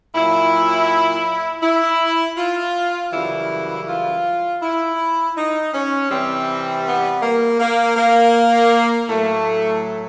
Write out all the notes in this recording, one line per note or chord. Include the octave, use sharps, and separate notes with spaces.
A#2 F#3 E4
E4
F4
F#2 C#3 E3 G3 E4
F4
E4
D#4
C#4
C3 E3 G3 C4
B3
A#3
A#3
A#3
A2 F#3 A3